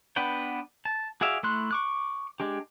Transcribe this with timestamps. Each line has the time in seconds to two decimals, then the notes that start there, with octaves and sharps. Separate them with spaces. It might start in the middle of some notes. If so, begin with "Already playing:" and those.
0.16 B3 D4 B4 F#5 G5
0.85 A5
1.21 F#4 G#4 D5 E5 F5
1.43 A3 E4 C6 F#6
1.71 C#6 D6 F#6
2.40 G#3 D4 G4